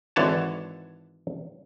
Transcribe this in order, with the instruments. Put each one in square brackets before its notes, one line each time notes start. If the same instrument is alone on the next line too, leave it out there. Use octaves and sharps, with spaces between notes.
[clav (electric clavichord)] G#1 D3 E3 C#5 G#5 A5